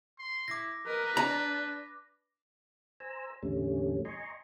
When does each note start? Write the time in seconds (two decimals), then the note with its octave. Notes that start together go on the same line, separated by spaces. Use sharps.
0.19 C6
0.48 E4 D6 A#6
0.86 A#4 B4 D#5
1.17 D4 A#5
3.00 C5 G#5 A#5 E6
3.43 E2 A2 D3 G3 A3 C#4
4.05 D#5 G#5 A#5 C6 C#6